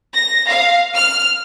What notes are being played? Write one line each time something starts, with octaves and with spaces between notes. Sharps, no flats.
A#6
F5
F6